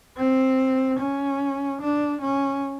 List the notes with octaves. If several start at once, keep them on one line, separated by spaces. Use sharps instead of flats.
C4
C#4
D4
C#4